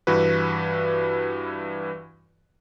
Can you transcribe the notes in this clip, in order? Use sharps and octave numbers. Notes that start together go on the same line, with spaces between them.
G2 E3 F#4 B4